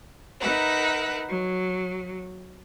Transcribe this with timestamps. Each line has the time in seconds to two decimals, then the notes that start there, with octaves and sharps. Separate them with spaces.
0.41 D#4 A#4 B4 E5 F#5
1.29 F#3